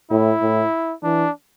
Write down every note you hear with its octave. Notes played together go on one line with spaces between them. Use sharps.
A2 E4
A2
E3 D4